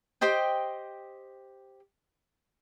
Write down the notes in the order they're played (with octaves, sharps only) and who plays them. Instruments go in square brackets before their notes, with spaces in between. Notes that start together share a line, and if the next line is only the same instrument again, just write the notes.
[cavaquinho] G4 C5 D#5 G5